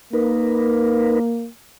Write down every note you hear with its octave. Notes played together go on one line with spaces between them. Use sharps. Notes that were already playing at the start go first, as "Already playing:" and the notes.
A#3 D#4 A#4 B4